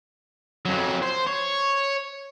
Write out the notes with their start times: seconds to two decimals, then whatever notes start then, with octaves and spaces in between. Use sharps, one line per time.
0.65 F2 F#3
1.03 C5
1.27 C#5